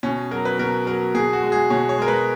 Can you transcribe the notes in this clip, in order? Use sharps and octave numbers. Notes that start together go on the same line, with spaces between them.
B2 C#4
F#3 A#4
B4
B2 A#4
F#3 A#4
B2 G#4
F#4
G#3
G#4
B2 C#5
C#5
G#3 A#4
B4